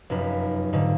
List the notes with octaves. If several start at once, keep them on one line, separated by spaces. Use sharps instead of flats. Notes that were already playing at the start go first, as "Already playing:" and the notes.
F1 F#2 D#4 B4
F2 G#2 D3 D#4